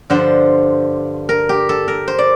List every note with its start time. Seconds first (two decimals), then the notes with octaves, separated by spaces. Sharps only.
0.10 G2 D3 F3 C5
1.29 A#4
1.49 G4
1.69 A4
1.88 A#4
2.08 C5
2.18 D5